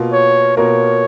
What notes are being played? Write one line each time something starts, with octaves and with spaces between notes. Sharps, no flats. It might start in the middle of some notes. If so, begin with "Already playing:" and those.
Already playing: B2 A#3 F4 A#4
C#5
B2 A#3 F4 A#4 C#5